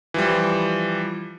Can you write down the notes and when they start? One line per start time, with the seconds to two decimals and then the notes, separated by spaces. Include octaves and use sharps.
0.14 E3 F3 G3